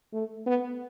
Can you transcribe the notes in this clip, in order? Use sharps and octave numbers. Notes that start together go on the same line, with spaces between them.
A3
B3